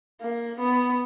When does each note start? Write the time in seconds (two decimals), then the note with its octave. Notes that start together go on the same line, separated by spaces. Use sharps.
0.21 A#3
0.60 B3